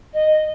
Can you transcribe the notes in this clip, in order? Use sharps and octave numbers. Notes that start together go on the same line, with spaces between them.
D#5